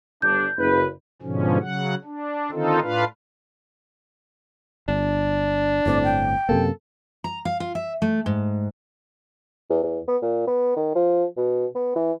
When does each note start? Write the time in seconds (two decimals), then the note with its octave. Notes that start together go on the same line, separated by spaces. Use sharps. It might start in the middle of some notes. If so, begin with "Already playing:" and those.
0.22 G1 D4 G6
0.57 F#1 B4
1.22 G#2 B2 D3 F3 C#4
1.60 C#3 F#3 F#5
2.04 D4
2.51 D3 D#3 C4 D#4 F4 A4
2.81 A2 D4 F4 B4 F5
4.88 G1 D4
5.86 G1 A2 C4 D5
6.04 G5
6.49 F#2 C3 A#3 A4
7.24 A#5
7.45 F5
7.60 F4
7.75 E5
8.02 A3
8.26 G#2
9.70 E2
9.84 E2
10.08 B3
10.23 A#2
10.48 B3
10.77 D#3
10.95 F3
11.37 B2
11.75 B3
11.96 E3